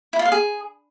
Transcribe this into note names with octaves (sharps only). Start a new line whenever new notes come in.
E4
F4
F5
G#4